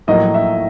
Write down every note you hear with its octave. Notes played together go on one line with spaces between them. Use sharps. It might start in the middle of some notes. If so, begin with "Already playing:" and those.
A#1 A2 F#3 A#3 D#5
E5